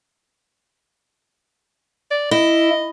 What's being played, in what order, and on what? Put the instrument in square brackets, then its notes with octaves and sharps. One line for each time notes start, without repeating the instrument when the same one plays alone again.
[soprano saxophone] D5
[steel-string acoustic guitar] E4 [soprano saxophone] D#5